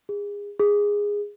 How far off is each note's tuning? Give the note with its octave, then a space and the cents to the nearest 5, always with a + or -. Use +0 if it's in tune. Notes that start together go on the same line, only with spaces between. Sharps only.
G#4 -30
G#4 -15